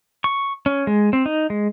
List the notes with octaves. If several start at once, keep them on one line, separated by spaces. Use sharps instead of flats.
C#6
C#4
G#3
C4
D#4
G#3